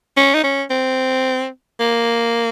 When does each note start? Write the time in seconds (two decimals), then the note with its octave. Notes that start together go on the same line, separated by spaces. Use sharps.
0.17 C#4
0.34 D#4
0.44 C#4
0.70 C4
1.80 A#3